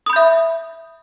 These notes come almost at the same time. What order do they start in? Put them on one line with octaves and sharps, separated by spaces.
D#6 B5 G6 E5